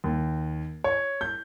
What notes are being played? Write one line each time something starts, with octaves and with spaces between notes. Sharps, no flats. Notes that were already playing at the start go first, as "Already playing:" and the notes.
D#2
C#5
G6